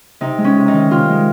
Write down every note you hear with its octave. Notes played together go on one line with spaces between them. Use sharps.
C3 D#4
G#3
C#4
C3
D#4
D#3
C3 F4
G#3